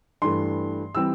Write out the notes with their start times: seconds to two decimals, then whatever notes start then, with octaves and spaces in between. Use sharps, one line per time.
0.22 G2 E3 A3 C6
0.95 E3 G3 C4 E6